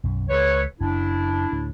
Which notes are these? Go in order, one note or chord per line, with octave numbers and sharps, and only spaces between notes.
B1 F#2
C#2 F3 G#3 A4 B4 C#5
F#1 F#2 D4 E4
D2 A2